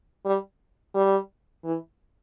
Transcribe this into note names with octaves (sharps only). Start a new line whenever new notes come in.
G3
G3
E3